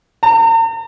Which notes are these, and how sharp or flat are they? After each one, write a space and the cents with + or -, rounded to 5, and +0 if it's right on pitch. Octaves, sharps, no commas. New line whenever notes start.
A#5 -45